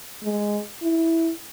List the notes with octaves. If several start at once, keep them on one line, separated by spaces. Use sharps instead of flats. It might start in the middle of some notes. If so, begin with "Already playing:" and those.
G#3
E4